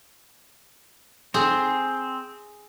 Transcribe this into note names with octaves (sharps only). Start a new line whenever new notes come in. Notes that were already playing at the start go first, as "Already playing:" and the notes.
C4 G#4